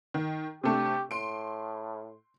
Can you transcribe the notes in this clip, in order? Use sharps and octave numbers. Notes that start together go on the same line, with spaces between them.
D#3
C3 A3 D4 G4
A2 C6 D7